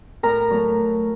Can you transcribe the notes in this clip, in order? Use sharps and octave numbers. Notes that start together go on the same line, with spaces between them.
A2 A#4 A#5
F#3 A3